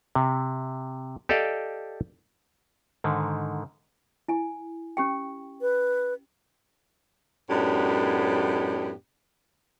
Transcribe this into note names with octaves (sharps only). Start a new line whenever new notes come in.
C3
G4 A4 D5 D#5 F5
G#2 D3 D#3
E4 G#5
C#4 G4 G5
B4
F#2 A2 G#3 B3 D4 G4